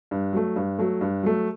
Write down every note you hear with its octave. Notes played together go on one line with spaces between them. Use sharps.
G2
F#3 A3
G2
F#3 A3
G2
F#3 A3